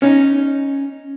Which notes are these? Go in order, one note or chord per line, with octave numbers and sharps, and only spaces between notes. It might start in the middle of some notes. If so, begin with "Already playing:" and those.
C#4 D#4